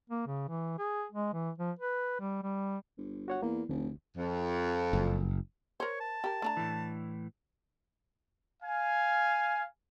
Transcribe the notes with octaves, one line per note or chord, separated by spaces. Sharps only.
A#3
C#3
E3
G#4
G#3
E3
F3
B4
G3
G3
G1
F#4 C#5 F#5
E2 A#3
F1 D2
F2
F#1
A#4 C5 C#5
A5
G4 A#4
A3 D4 A#5
A2 E3
F5 G#5